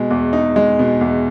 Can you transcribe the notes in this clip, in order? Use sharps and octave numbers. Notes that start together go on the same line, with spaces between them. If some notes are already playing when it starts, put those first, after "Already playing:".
Already playing: B2 G#3
E2
D#4
G#3
B2
E2